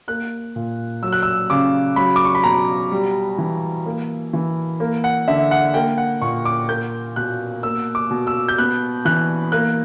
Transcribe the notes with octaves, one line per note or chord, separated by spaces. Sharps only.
A#3 F#6
A#2
F#3 E6
F#6
E6
C#3 D6
F#3 B5
D6
C#6
B5
B2 A#5
G3
E3
A#3
E3
A#3
F#5
D3 E5
F#5
A#3 G5
F#5
A#2 C#6
D6
A#3 G6
B2 F#6
A#3 E6
D6
B2
E6
G6
B3 F#6
E3 F#6
A#3 F#6